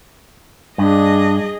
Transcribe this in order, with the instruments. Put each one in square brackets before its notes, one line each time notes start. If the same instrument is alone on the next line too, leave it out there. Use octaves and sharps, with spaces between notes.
[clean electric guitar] G2 [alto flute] D4 [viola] G#4 D#5